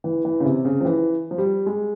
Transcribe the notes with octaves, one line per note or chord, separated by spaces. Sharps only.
E3
E3
C#3
C3
C#3
F3
E3
F3
G3
G#3